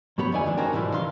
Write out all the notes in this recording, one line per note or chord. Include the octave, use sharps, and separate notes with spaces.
G#2 F#3 B3 G4 C#5 B5
F2 D#3 D#4 D5 E5 G#5
D#3 E3 G#3 D4
C#4 F#4 A#4 C5 G5 A5
B1 G#2 E3 G3 E4 F4
D#3 E3 F5 C6